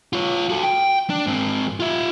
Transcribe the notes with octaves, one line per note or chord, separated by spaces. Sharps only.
F4 C#5
F#4 A4
G5
D4
G#2 C4
F4 E5